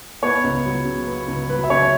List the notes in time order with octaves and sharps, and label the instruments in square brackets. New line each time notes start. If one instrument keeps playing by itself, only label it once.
[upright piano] B3 C#5
C#2
F#3
C#3
B3
C#2
F#3 B4
E5
C#3 C#5